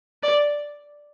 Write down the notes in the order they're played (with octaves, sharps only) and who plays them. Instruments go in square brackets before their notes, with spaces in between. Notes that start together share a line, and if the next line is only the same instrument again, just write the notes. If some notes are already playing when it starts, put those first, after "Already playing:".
[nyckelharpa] D5